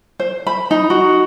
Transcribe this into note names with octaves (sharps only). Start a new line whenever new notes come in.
C5
B5
D#4
F#4